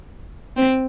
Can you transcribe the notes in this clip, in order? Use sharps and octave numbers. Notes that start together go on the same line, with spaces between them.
C4